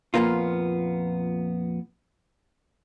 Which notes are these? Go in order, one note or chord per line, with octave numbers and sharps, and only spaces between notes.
F2 A#2 A#3 B3 F4